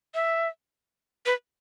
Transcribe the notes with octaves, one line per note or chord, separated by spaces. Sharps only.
E5
B4